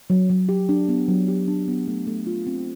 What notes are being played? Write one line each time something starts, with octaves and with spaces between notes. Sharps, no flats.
F#3
F#3
G4
D4
B3
F#3
G4
D4
B3
A3
A3
F4
C4